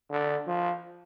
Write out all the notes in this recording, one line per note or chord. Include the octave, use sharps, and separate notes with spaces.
D3
F3